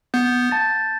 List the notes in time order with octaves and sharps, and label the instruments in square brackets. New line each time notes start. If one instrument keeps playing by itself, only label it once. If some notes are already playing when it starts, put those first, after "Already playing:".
[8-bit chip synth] B3 [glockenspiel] G6
[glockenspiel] A5 A6